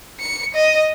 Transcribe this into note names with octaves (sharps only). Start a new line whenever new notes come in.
C#7
D#5